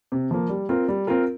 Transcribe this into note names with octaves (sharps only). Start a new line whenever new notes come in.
C3
F3 A#3
G3
C4 F4 A#4
G3
C4 F4 A#4